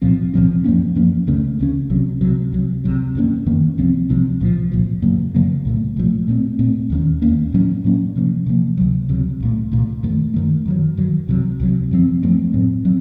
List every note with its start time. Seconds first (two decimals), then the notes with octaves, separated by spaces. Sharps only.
0.02 C2 A#2 F3 C4
0.34 C2 A#2 F3 C4
0.64 F#2 F3 A#3 C#4
0.95 F#2 F3 A#3 C#4
1.27 C#2 C#3 A3 C#4
1.59 C#2 C#3 A3 C#4
1.90 C2 C3 F#3
2.21 C2 C3 F#3
2.53 C2 C3 F#3
2.84 C2 C3 F#3
3.15 F#2 D#3 A#3 C#4
3.46 F#2 D#3 A#3 C#4
3.78 C2 C3 F3 C4
4.09 C2 C3 F3 C4
4.40 C2 A#2 F3
4.72 C2 A#2 F3
5.02 F#2 C#3 F#3 A#3
5.35 F#2 C#3 F#3 A#3
5.65 C2 A#2 F3 A3
5.96 C2 A#2 F3 A3
6.28 A#2 A3 C4
6.59 A#2 A3 C4
6.90 D#2 D#3 A#3 C#4
7.22 D#2 D#3 A#3 C#4
7.52 A2 F#3 A#3 C#4
7.84 A2 F#3 A#3 C#4
8.16 C3 F3 A#3
8.46 C3 F3 A#3
8.77 C#2 C3 F#3
9.09 C#2 C3 F#3
9.40 C2 A#2 A3
9.72 C2 A#2 A3
10.03 F#2 D#3 A3
10.34 F#2 D#3 A3
10.65 F#2 D#3 F#3
10.97 F#2 D#3 F#3
11.28 C2 C3 F#3
11.60 C2 C3 F#3
11.91 F#2 F3 A3 C4
12.23 F#2 F3 A3 C4
12.54 A2 F#3 C4
12.85 F#3 C4